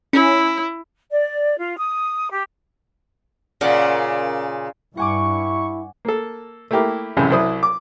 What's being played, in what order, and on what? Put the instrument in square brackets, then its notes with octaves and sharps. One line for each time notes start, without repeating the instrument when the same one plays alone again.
[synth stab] C#4 [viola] E4
[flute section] D5
F4
D#6
G4
[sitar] A#2 C#3 [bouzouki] A#4 D5 F#5
[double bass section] G2 [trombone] E4 [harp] F#5 G#5 D6 [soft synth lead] C#6
[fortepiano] A#3 A4
A3 A#3 E4 G4 A#4
A1 F#2 C3 G#3 C#4 E4
C2 F#3 E4 C5 D#6
D6